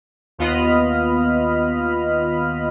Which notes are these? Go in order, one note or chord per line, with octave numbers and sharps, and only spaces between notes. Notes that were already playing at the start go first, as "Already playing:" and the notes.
D#2 B3 F4 D#5 B5 F6